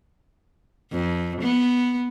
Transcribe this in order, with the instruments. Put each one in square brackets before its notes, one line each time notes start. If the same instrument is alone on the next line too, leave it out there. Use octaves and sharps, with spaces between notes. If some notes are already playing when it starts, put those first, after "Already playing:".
[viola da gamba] F2
B3